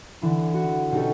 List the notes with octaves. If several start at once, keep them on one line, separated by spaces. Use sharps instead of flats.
D3 E3 D4
F#4
B2 C#4 D#4 G4 A4